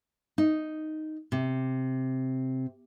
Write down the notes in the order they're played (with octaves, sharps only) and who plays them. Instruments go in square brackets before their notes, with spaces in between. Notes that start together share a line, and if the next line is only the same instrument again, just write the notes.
[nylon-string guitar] D#4
C3